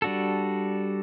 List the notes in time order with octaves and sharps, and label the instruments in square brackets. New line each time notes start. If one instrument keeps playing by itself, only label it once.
[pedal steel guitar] G3 D4 F#4 A4